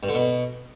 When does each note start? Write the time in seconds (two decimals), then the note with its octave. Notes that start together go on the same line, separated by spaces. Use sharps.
0.03 G2
0.08 D3
0.14 B2